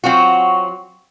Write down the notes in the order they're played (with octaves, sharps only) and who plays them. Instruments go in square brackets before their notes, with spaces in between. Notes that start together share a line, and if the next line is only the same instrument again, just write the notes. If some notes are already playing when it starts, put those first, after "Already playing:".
[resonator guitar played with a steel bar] F#3 C4 F4 F#4